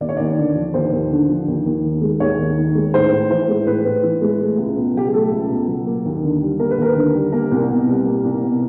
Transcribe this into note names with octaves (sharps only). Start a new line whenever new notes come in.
D#2 D5
C#5
D#2 D5
D3
F3
D#2 C5
D#2
D3
F3
D#2
D#2
D#3
G#3
D#2 C#5
D#2
D#3
G#3
A2 C5
A2
E3 C5
G#3
A2 B4
A2
E3
G#3
A3
C#2
B2
F#3 G4
G#4
A3 A4
C#2
B2
F#3
A#3
D#2
D3
G3
A#3 A#4
B4
D#2 A#4
D3
G3
A#3 A#4
C2
B2
G3
A#3
C2
B2